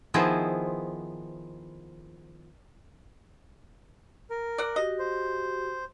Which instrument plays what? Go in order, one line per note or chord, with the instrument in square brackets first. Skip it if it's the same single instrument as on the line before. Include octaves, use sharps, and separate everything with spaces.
[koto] D#3 F3 B3 E4 G#4 C5
[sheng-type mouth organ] A#4
[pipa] D5 F#5
[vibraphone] F#4 G4 [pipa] D#5
[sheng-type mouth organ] C5